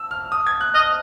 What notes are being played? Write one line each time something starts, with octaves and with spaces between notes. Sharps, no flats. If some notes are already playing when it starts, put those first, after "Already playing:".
Already playing: E6
F6
D#6
G#6
F#6
D#5 F6